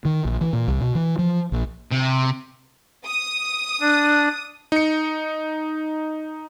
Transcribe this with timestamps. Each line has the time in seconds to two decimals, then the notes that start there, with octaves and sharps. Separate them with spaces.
0.05 D#3
0.25 A#1
0.41 E3
0.53 A#2
0.68 C2
0.81 B2
0.95 E3
1.19 F3
1.52 A#1
1.92 C3
3.05 D#6
3.81 D4
4.72 D#4 C#7